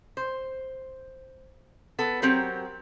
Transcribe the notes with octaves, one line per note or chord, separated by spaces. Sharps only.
C5
B3 A4
F#3 C4 G4 A#4